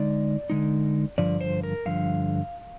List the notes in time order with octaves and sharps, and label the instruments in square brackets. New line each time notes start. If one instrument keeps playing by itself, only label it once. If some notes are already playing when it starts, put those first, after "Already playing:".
Already playing: [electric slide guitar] D3 G#3 D#4 D5
D3 G#3 D#4
G2 D3 F3 D5
C5
A#4
G2 D3 F3 F5